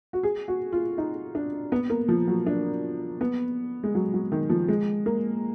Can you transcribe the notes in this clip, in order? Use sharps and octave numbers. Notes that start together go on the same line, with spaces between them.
F#4
G#4
F#4
F4
D#4
D4
B3
A#3
F3
F#3
D4
B3
G#3
F#3
F#3
D#3
F3
G#3
A#3